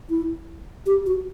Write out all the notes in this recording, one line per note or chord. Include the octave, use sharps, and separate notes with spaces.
E4
G4
F#4